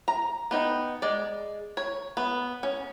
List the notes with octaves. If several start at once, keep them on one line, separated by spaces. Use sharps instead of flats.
A#5
B3 D#4 D#5 G5
G#3 D5
C#5
B3
C#4